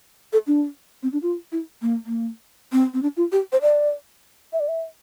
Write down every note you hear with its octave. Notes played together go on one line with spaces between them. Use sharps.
A4
D4
C4
D4
F4
E4
A#3
A#3
C4
C4
D4
F4
G4
C5
D5
E5
D5
E5